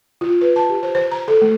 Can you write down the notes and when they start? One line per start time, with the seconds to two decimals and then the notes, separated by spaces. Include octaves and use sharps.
0.21 F4
0.41 B4
0.56 A5
0.69 G4
0.83 C5
0.95 C5
1.11 A#5
1.28 A4
1.42 A3